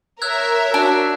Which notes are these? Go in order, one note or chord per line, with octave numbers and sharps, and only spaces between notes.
A#4 C#5 E5 E6 F#6 G#6
D4 F#4 E6 F#6